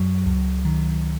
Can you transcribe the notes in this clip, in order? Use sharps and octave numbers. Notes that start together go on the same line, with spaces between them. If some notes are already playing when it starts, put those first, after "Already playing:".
Already playing: F#2 F#3
C#2
D#3